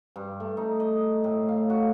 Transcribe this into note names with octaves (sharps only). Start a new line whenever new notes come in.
G2
A3
D#4
D#5
A2
F5
F#4